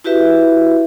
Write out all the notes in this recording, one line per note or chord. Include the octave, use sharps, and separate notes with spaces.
E4 F#4 G4 B4 E5